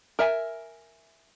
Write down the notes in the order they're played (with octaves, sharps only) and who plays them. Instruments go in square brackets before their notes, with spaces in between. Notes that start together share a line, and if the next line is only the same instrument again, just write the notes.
[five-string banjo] A#4 E5 G#5